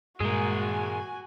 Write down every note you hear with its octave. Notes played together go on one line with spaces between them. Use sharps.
G2 A#2 G#3 F#4 G#4 A#4 G#5